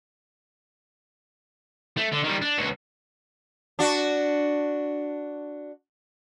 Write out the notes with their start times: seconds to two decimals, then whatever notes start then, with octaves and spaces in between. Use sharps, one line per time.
1.97 A3
2.12 D3
2.24 D#3 G3
2.42 D4
2.58 C#2 F#4
3.79 D4 F#4